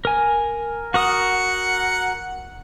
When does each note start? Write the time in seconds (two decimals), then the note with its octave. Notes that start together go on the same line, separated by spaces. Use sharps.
0.05 A#4 G#5
0.94 F#4 A#4 F#5 D#6